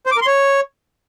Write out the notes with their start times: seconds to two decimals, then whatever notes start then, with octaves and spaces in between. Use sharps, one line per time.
0.06 C5
0.12 D6
0.17 A#4
0.22 C6
0.27 C#5